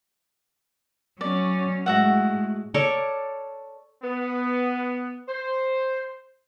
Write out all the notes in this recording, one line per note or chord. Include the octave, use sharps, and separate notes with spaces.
F#3 C#4 D5
A2 G#3 F#4 E5 F#5
A4 A#4 C#5 D5
B3
C5